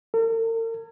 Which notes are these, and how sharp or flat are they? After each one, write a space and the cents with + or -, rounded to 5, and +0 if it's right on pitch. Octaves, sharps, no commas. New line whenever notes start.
A#4 -45